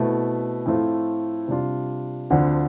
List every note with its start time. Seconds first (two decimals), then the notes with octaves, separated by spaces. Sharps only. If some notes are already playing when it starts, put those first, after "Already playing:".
Already playing: B2 A3 C4 E4
0.66 A2 F3 A3 C4 F4
1.48 C3 G3 D4 F4
2.30 D2 D3 F3 C4